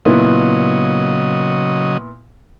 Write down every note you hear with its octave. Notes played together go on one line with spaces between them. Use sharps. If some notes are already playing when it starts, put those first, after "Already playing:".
A#2 C#3 F#3 B3 E4 D#5